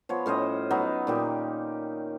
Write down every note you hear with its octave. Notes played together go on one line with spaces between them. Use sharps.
F3 B3 C#5
A2 C#4 C5 D#5
F#3 B3 D#4
A#2 D#3 G4